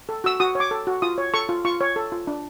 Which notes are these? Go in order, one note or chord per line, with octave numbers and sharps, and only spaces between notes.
A4
F#4 E6
F#4 D#6
C#5
D6
A4
F#4
F4 D#6
C#5
A4 C#6
F4
F4 C#6
C#5
A4
F4
D4